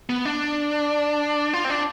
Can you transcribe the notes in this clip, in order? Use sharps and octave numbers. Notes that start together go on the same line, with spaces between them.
B3
D4
F4
C4
D4